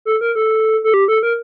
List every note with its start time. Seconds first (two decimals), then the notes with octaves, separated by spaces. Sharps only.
0.05 A4
0.21 A#4
0.36 A4
0.84 A4
0.94 G4
1.08 A4
1.23 A#4